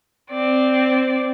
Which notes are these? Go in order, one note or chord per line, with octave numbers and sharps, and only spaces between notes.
C4 D5